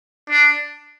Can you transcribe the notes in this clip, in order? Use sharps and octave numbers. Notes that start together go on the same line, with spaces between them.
D4